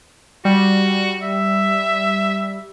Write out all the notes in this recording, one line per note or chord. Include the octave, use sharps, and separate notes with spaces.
G3 F#4
E5